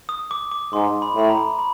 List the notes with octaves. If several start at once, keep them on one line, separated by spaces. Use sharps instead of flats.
D#6
D6
D6
G#2 C6
B5
A2 B5
A#5
B5